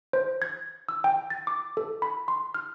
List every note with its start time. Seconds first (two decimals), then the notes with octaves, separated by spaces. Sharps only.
0.13 C5
0.42 G#6
0.89 E6
1.04 G5
1.30 A6
1.47 D6
1.77 A4
2.02 B5
2.28 C6
2.54 F6